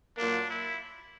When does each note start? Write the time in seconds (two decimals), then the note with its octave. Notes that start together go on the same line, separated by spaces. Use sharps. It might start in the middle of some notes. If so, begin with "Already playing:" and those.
0.17 A#2 F#3 A#3 D4
0.50 E4